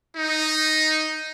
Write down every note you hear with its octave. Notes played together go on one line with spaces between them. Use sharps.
D#4